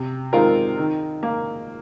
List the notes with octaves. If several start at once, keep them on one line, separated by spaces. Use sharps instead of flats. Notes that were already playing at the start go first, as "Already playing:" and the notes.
Already playing: C3
D#3 G#3 C4 F4 A#4
D#3
A#3